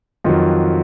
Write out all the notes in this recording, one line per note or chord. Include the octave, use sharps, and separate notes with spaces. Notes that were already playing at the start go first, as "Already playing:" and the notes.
F2 D#3 F#3 F4